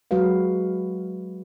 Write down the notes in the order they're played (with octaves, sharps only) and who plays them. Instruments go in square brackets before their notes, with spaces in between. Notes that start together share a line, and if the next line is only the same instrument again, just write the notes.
[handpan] F#3 G#3 F#4 B4 F5